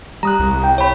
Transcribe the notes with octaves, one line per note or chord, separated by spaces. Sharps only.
G3 A#5 D#6 F#6
C2
G5
C#5 B5